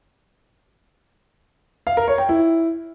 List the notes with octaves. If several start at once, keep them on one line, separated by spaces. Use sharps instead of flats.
F5
A#4
C#5
G5
E4